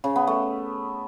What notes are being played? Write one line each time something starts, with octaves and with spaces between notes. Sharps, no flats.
C#3
B3
A3